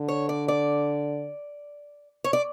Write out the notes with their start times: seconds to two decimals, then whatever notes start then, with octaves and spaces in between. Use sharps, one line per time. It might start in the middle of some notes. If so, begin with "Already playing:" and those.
Already playing: D3
0.08 C#5
0.29 D5
0.48 D5
2.24 C#5
2.33 D5